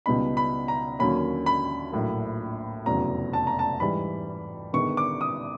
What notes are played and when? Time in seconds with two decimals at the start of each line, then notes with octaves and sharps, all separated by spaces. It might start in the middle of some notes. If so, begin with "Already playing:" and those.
0.06 C#2 B2 G3 B3 D#4 B5
0.37 B5
0.68 A#5
0.99 D#2 D3 F#3 A#3 C#4 B5
1.46 B5
1.92 A#1 A2 F#3 A#3
2.86 F1 E2 C#3 F#3 A#5
3.33 A5
3.47 A#5
3.59 A5
3.80 G#2 E3 G3 B5
4.73 G1 G2 D#3 G#3 B3 C#6
4.97 D6
5.21 D#6